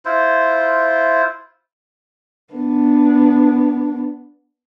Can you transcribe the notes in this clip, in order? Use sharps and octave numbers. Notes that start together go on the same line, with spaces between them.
E4 F4 C5
B3 D4